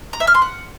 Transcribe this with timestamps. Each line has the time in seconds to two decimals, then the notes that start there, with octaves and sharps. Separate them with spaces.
0.13 A#5
0.20 E5
0.27 F6
0.35 C6
0.42 F#5